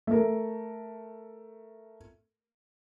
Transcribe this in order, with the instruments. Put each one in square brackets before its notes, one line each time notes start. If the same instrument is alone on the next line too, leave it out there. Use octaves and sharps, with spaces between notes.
[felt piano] A3 A#4